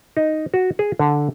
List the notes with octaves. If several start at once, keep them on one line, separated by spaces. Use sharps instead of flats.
D#4
F#4
G#4
D3